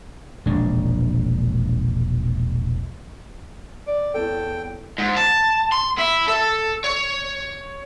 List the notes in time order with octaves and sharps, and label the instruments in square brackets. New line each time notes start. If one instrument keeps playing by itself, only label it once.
[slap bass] E1 A#1 G#3 D4
[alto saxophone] D5
[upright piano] E2 B3 C#5 [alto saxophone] A4 [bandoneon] G5
[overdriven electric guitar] G#2
A5
C6
E4
A4
C#5